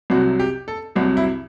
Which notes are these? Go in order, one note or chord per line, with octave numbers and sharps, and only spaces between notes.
C2 C3 F#3 F#4
G4
A4
C2 C3 F#3 F#4
E4